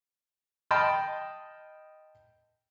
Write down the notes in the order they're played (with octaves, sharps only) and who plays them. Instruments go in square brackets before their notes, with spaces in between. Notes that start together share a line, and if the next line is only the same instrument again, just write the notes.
[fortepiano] D#5 G5 A5 B5 C6 F6